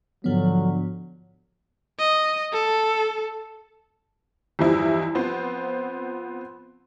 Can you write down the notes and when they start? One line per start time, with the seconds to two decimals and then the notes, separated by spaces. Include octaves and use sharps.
0.24 G#2 D3 F3 F#3 B3
1.99 D#5
2.53 A4
4.59 E2 G2 F3 G3 D#4 E4
5.15 F3 B3 C4 C5